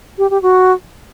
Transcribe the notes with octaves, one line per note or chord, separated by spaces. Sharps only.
G4
G4
F#4